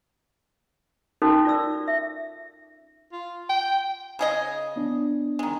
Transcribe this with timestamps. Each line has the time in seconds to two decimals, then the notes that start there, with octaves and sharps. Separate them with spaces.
1.22 C#4 D#4 F#4 A4 A#4 C5
1.45 F4 D5 E6
1.88 E5
3.12 F4
3.49 G5
4.19 C#3 G#4 D#5
4.76 B3 D4
5.39 D#3 G#3